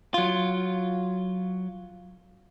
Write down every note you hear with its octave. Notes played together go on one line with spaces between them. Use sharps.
F#3 F4